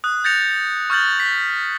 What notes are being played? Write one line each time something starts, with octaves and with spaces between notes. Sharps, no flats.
D#6 F#6
G6 A6 A#6 C#7 F7
C#6 F6 G6 A6 F#7
B6